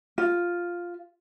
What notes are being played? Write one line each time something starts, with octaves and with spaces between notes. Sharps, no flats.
F4